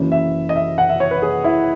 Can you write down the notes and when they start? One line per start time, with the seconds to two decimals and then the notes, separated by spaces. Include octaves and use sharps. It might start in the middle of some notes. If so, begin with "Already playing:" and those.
Already playing: F#1 F#2 C#3 E3
0.12 E5
0.49 D#5
0.56 E5
0.78 F#5
0.89 E5
1.00 C#5
1.11 B4
1.22 G#4
1.44 E4